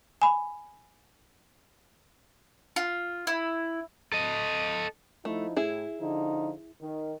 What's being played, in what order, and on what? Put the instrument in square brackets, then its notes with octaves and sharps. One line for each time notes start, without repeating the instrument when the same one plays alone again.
[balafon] G#5 B5
[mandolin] F4
E4
[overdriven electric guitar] A4 D#5
[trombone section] F3 D#4 E4 [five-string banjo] A3
[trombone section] A2 [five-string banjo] E4 G#4
[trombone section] D3 F3 D#4
D#3